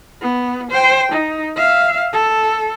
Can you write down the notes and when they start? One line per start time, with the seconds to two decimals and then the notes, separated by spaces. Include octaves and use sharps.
0.22 B3
0.71 C5 G5
1.12 D#4
1.56 E5 F5
2.13 A4